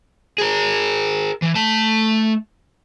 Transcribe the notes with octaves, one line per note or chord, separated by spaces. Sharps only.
G#4 A#4
E3
A3 A5